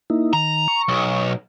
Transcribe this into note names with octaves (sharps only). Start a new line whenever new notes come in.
A#3 D#4 E4
D#3 A#5
C#6
B1